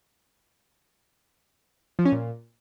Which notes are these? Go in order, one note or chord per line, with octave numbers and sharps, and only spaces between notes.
F3
C#4
A#2